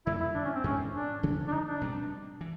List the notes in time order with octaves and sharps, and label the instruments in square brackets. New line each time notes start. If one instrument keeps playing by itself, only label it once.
[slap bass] F2 D3 G3 A#3 [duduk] E4
[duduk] E4
D4
C#4
C4
[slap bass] G#2 D#3 G#3 B3 [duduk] C#4
[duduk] D4
[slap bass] D2 C#3 F3
[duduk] D4
D#4
D4
[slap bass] B2 G3 C4
E3